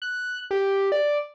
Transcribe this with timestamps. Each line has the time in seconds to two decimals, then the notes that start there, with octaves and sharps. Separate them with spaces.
0.02 F#6
0.51 G4
0.92 D5